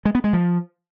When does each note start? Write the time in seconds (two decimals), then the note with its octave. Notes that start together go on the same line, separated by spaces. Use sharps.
0.05 G#3
0.15 B3
0.24 G#3
0.33 F3